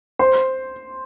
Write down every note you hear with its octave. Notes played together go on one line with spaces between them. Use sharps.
C5 C6